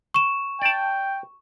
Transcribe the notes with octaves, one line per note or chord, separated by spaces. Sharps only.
C#6 E7
D5 G5 A5